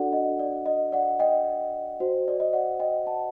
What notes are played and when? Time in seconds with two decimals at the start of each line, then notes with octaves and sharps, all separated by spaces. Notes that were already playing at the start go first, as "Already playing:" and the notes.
Already playing: D4 F#4 A4 D5 F#5
0.13 D#5
0.39 D5
0.66 D#5
0.92 D5 F#5
1.19 D#5 G5
2.00 F#4 C5
2.28 D5
2.40 D#5
2.53 D5 F#5
2.80 D#5 G5
3.06 F#5 A5